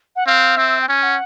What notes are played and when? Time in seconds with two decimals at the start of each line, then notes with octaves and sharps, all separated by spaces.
0.16 F#5
0.27 C4 F5
0.57 C4 E5
0.81 G5
0.88 C#4 G#5
1.03 F#5